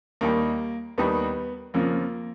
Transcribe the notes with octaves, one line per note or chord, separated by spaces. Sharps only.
D#2 D#3 G3 A#3
D#2 D#3 G3 B3
F2 C#3 F3 A#3